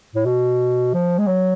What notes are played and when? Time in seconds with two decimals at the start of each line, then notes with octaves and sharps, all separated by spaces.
0.15 A2
0.26 B2
0.94 F3
1.18 G#3
1.27 F#3